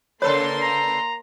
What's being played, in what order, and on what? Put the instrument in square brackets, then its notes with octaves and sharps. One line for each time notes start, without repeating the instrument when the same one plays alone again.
[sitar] C#3 A4 B4 [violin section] A#3 C6 [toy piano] C#5
[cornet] A#5